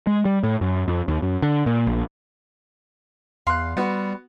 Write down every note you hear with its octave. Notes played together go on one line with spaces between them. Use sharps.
G#3
G3
A2
F#2
F2
D#2
F#2
D3
A#2
A#1
E2 F5 C6 F#6
G3 B3 F#4